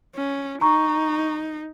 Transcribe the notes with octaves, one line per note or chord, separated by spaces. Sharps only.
C#4
D#4 A#5 C#6